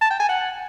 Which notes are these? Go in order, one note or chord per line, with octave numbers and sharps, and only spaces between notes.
A5
G5
G#5
F#5